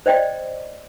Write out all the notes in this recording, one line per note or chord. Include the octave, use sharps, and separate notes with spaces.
C5 D5 D#5 G5